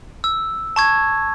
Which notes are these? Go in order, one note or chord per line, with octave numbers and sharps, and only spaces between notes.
E6
A5 C#6 G#6